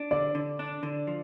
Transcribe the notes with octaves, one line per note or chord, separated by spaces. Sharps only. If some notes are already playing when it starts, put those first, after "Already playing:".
Already playing: D4
D3 D5
D3
D4
D3
F3